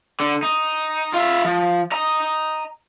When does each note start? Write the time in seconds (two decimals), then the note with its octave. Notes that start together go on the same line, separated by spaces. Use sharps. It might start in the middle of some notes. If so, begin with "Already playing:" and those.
0.20 D3
0.43 D#4
1.14 F4 E5
1.45 F3
1.92 D#5 A#5